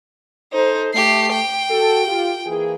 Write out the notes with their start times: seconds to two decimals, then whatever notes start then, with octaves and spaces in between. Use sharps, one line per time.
0.53 D#4 A4 C5
0.94 A3 G4 C7
1.32 G5
1.70 F#4 A4
2.06 F4 G4
2.46 E3 A#3 G#4